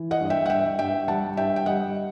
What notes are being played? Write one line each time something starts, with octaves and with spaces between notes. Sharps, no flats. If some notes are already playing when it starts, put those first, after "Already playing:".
Already playing: E3
D#5 F#5
G2
E5 G5
F#5
G2 E5 G5
G2 E5 G5
G3 F#5 A5
G2 E5 G5
G5
G3 D#5 F#5